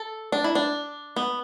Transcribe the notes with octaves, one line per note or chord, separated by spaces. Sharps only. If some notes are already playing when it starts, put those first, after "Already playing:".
Already playing: A4
D4
E4
D4
B3